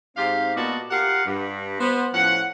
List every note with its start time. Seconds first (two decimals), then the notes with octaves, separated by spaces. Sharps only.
0.17 G#2 C4 G4 F5
0.55 A#2 B3 F#4 D5 D#5 A5
0.91 F4 G4 A#4 F5 F#5
1.26 G2
1.80 B3 C5
2.14 A2 F3 C#4 F#5